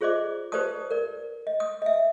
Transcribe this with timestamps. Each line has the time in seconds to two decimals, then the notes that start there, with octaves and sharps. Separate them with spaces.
0.01 F4 G#4 C5 D5 D#5 D6
0.52 G4 B4 C5 D5 A5 D#6
0.91 A#4 D5
1.47 D#5
1.60 D#6
1.82 D#5 E5